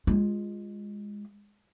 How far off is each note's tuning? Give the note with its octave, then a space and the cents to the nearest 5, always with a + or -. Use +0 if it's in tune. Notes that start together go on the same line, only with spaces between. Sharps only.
G#3 -15 F4 +0